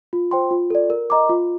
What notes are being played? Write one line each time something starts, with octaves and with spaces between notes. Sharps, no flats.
F4
C5 G5 C6
F4
A4 D5
A#4
D#5 A#5 D6
F4